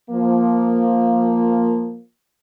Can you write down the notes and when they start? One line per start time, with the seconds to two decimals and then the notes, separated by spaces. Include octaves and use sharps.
0.10 F3 A#3